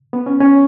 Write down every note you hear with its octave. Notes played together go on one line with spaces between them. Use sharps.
B3
C#4
C#4